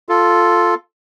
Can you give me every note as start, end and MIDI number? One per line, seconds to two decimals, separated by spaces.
0.09 0.74 65
0.09 0.74 69